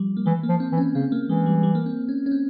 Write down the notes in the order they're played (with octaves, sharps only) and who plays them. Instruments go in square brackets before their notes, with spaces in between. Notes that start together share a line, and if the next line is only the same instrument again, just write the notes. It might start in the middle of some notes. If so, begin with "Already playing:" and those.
Already playing: [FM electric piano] F3 G3
A#3
[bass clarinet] E3 [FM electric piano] G#3
[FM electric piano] A#3
[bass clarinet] F3
[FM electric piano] C4
[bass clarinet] E3
[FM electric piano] C#4
[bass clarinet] C#3 [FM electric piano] C4
[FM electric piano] A#3
[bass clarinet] E3 [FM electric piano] G#3
[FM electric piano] G3
G3
A#3
C4
C#4
C#4
C4